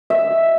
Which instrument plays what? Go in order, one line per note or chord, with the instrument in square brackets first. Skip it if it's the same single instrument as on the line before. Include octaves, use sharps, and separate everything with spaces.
[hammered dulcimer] E5